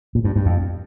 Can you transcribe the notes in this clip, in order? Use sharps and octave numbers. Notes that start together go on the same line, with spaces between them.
A#2
G2
G2
F2